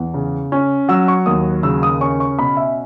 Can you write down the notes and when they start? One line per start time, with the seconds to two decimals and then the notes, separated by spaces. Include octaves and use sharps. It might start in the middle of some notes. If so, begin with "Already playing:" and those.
Already playing: E2
0.14 C#3
0.52 C#4
0.89 F#3 E6
1.08 C#6
1.26 D#2 D#6
1.63 C#3 E6
1.83 D#6
2.01 C#4 C#6
2.20 C#6
2.39 B2 B5
2.57 E5